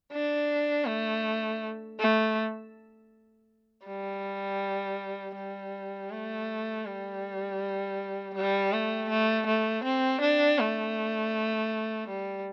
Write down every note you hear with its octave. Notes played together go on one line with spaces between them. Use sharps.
D4
A3
A3
G3
G3
A3
G3
G3
A3
A3
A3
C4
D4
A3
G3